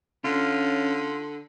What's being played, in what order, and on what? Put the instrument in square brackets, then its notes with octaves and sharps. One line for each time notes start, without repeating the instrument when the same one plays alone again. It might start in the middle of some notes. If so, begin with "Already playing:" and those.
[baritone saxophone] D3 [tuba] C#4 [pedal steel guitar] F4